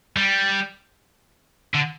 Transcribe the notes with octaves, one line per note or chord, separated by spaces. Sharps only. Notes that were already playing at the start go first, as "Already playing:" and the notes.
G3
D3